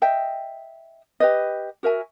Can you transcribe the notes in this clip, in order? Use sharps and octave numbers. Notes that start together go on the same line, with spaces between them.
D#5 E5 G5
G4 B4 D#5
F#4 A#4 E5 G#5